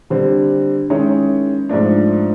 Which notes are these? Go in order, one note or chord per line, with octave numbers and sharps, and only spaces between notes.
D3 G3 C4
D#3 G#3 C#4 E4
G#2 F3 A3 D4